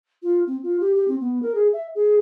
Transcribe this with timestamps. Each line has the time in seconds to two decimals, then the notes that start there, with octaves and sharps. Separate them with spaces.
0.22 F4
0.46 C4
0.63 F4
0.80 G4
0.95 G4
1.08 C4
1.20 B3
1.42 A#4
1.54 G#4
1.73 E5
1.95 G#4